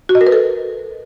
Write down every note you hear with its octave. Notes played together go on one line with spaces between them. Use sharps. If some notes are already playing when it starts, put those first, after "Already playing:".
F#4
D#5
A#4
B4
A4